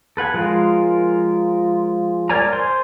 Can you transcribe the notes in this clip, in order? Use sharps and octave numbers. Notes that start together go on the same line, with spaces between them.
A4 B4 F#5 G#5
F3 G#3 F4 A#4
A#4 C#5 D5 G#5 A#5
C5 G#5 C6